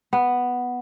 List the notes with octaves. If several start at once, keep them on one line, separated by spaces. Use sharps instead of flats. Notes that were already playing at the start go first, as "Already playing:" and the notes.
B3